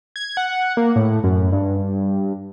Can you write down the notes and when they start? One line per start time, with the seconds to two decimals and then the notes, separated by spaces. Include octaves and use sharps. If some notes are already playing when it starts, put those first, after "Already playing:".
0.16 G#6
0.37 F#5
0.77 A#3
0.96 A2
1.24 F#2
1.52 G2